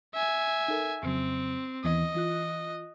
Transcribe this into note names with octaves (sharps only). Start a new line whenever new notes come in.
E5 G#5
D#4 A4 A#4
F2 C#3 F#3 C4
D#2 E3 B3 D#5
E3 F4 F#6